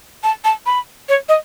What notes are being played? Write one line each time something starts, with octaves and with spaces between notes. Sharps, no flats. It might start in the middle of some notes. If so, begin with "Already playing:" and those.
A5
A5
B5
C#5
D#5